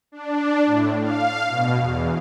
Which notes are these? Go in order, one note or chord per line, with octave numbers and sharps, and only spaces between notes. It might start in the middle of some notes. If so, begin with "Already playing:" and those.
D4
A2
F5
B2
E2